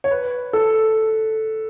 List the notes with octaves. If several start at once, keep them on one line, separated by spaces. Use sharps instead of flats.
C#5
B4
A4